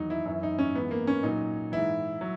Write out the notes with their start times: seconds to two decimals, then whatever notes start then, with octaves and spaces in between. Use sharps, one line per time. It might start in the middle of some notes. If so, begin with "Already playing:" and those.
Already playing: E2 D#3 F#3 D#4
0.10 E4
0.26 F#2 E3 E4
0.43 D#4
0.59 C#4
0.75 G#2 E3 B3
0.91 A#3
1.07 C#4
1.23 A#2 F#3 D#4
1.72 G#2 E3 E4
2.21 F#3